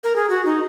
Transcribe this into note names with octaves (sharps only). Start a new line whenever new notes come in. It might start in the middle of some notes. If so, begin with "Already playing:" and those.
A#4
G#4
F#4
D#4